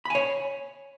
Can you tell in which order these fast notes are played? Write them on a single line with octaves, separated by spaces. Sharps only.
B5 G#5 C#5